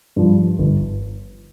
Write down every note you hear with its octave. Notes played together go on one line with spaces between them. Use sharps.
G2 F3
G1